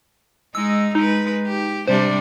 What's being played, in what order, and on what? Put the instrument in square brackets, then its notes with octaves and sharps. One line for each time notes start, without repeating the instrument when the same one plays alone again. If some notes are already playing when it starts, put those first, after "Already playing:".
[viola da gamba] G#3 D#4 [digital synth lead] E6
[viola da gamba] G#3 B4 [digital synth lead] D#4
[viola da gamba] G4
[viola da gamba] C3 G3 D4 [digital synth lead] C5